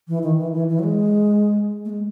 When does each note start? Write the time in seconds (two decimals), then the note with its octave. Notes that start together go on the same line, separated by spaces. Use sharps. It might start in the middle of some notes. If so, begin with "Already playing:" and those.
0.08 E3
0.23 D#3
0.38 E3
0.53 E3
0.69 E3
0.79 F#3
0.83 G#3
1.85 A3
1.90 G#3